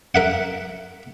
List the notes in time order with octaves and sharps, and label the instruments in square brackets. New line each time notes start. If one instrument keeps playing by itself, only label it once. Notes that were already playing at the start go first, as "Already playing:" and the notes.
[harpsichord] A#4 E5 F#5